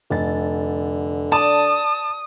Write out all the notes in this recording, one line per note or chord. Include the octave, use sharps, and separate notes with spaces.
F1 D3 A6
D5 A5 D#6